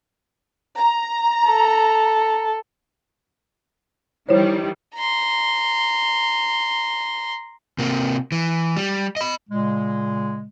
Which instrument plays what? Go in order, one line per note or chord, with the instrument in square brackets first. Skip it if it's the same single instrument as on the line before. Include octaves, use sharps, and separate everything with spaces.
[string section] A#5
[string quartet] A4
[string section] D#3 E3 G3 [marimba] E4 C5 C#5
[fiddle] A#5 C6
[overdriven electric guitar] C3 A#3
E3
G3
D#5 B5
[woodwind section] A#2 C#3 G#3